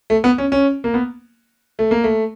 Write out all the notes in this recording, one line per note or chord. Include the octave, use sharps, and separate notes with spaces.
A3
B3
C#4
C#4
A#3
B3
A3
A#3
A3